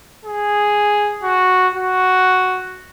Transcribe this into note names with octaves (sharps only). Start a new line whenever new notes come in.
G#4
F#4
F#4